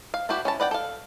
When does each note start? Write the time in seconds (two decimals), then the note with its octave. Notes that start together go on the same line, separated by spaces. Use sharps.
0.14 F5
0.29 D4 E4 F#4 G4 B4
0.45 C#4 E4 A5
0.60 B4 D5 F#5 G5
0.71 A4 F5